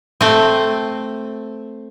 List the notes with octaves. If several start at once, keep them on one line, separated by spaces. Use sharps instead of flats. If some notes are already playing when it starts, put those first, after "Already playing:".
A3 C4